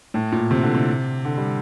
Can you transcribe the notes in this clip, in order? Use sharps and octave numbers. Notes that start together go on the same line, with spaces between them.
A2
A#2
C3
D3
C3
D3
G3